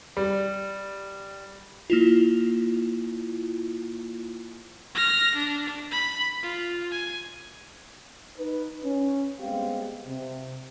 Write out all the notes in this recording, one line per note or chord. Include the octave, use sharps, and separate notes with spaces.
G3
A#3 E4 F4
F6 A#6
D4
B5
F4
G#5
D#4 B4
C#4
G3 G#3 B3 C4 G4 F5
C3